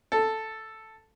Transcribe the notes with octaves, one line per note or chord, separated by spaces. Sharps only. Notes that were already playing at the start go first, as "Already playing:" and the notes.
A4